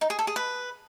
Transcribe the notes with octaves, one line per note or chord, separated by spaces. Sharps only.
D#4
G#4
A4
G#4
B4